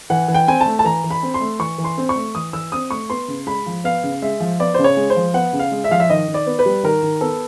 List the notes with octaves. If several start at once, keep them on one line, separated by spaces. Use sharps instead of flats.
E3 F#5
E3
G5
C4 G#5
A5
A3
A5
E3 A#5
E3
B5
C4
C6
A3
E3 C#6
E3
C6
C4
C#6
A3
E3 D#6
E3 E6
C4 D#6
A3 C#6
B3 C6
C#3
G#3 B5
F3
B3 F5
C#3
G#3 E5
F3
B3 D5
C#3 C5
C#5
G#3
C5
F3
B3 F#5
C#3
F5
G#3
E5
F3 F5
E5
D#3 D#5
D#3
D5
B3
B4
G3
D#3 A#4
D#3
B3 A4